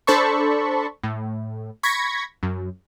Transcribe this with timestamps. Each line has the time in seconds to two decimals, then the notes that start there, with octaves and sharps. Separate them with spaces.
0.07 D4 A4 C5 A5 B5 C#6
1.03 A2
1.83 B5 C#6 G#6 A#6 B6
2.43 F#2